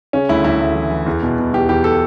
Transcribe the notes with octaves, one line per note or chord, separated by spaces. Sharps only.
C#3 C#4
D2 E4
D2 E4
D2
E3
E3
E2
B2
B2
E2 G4
E2 G4
A4